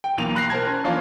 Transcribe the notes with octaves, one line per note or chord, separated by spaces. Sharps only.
G5
B1 E3 A#3 D#7 F7
B5 F#6 A#6 C7
A#4 C5 A5 G#6
C#4
E3 F3 A#3 C#4 D4 F4